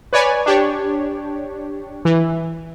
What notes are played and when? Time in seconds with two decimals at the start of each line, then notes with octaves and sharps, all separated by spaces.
0.13 B4 C#5 D5 G#5
0.46 D4 G4 C#5
2.05 E3